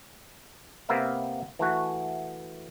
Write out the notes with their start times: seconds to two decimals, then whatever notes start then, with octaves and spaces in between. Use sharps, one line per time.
0.89 C3 A#3 B3 A#4 E5 F5
1.59 E3 A3 F#4